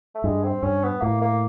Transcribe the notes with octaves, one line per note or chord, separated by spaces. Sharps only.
A3
G2 G#3
C4
G2 C#4
B3
A2 A#3
A#3